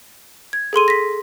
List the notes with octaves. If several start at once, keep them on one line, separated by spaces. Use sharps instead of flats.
G#6
G#4 A4 C6 D#7
A#6 B6